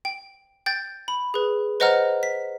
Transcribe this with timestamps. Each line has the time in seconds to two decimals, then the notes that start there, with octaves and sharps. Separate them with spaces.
0.05 G5
0.66 G5 G6 A6
1.08 B5
1.34 G#4 B4
1.80 B4 C5 D#5 F#5 A#5 F6
2.23 B6